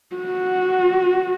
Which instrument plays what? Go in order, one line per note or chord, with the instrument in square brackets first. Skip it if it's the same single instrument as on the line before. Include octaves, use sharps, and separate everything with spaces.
[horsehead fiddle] F#4